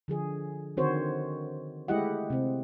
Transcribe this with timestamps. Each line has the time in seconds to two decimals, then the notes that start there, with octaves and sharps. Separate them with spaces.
0.08 D3 F3 G#4
0.77 D3 D#3 C4 F#4 C5 C#5
1.88 G#3 A3 E4 G4 D#5 F#5
2.30 C3 C4